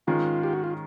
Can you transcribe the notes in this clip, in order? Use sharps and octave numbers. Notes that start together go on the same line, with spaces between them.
G#2 D#3 G#3 C#4 F4
G4
F#4
F4